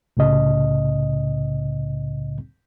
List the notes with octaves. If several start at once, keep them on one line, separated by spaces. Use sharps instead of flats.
C2 A2 C#3 D#5